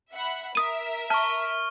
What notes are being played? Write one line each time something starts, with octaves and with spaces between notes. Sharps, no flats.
E5 F#5 B5
A#4 E5 D#6 D#7
A5 C#6 F6